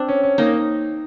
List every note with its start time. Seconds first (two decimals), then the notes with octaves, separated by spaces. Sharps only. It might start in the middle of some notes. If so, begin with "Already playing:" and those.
Already playing: C4 D4
0.08 C#4
0.23 C#4
0.38 A#3 D#4